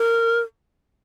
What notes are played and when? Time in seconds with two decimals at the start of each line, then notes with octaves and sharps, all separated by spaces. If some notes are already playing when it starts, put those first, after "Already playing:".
Already playing: A#4